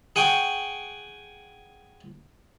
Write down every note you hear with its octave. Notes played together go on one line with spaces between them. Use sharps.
G#4 F#5 G5 C#6